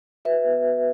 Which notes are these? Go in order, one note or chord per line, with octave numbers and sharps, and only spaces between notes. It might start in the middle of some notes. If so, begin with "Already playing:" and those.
F#4 B4 E5
B3
F#4